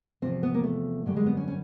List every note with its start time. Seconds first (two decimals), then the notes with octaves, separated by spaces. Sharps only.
0.22 E2 C3 F3 C4
0.43 B3
0.54 A#3
0.64 A3
1.06 F#2 D3 G3 A3
1.16 G#3
1.26 B3
1.37 C#4
1.48 C#4